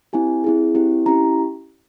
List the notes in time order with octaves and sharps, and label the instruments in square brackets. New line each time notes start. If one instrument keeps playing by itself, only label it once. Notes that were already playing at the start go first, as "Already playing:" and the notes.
[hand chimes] C4 E4 G4 G#5
C4 E4 G#4
C4 E4 G4
C#4 E4 G4 A#5